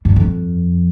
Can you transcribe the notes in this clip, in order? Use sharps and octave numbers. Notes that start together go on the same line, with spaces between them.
G2
F2